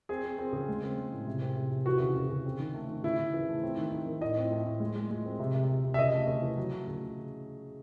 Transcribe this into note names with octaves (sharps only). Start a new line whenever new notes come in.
C4 G#4
C4
C4
C#3
G#3
C4
G#3
A2
C3
C4
C3
C3
E3 F#4
C#3
C#3
C#3
C4
D#3
A3
D#3
C#3 E4
C#3
E3
A3
C4
D#3
D#3
D#3
A2 D#5
C4
A2
A2
G#3
G#3
G#3
C4
C3
C3
C3
C3
E5
C#3 D#5
A3
C#3
E3
F#3
A3
C#3